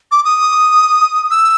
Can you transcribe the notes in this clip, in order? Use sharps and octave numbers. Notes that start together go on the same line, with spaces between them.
D6
D#6
E6